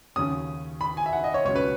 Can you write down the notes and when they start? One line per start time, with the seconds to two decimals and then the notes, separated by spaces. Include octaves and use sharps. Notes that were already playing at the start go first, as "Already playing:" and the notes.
0.16 D#2 C#3 F#3 C#4 D#6
0.81 B5
0.97 G#5
1.06 E5
1.13 F#5
1.24 D#5
1.34 C#5
1.45 C#2 B2 F#3 C#4 C#5
1.56 B4